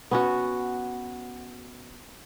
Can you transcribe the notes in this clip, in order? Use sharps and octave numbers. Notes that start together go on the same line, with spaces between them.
B3 C#4 F#4